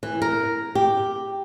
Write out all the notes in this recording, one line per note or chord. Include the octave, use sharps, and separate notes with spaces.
E3
A#4
G4